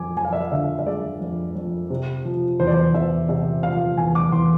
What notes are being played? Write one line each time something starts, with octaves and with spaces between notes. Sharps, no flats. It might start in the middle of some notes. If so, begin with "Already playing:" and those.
Already playing: F2 G#5 D6
F2 G#5
F5
E5
F5
D3 E5
E5
G#3 D5
F2
F2
C3
F3
E2 C5
D5
C5
E2 E5
C3 E5
F3 F5
E2 G#5
D6
E2 C6